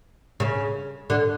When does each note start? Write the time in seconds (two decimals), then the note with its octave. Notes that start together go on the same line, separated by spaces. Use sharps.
0.40 C#3
1.10 D3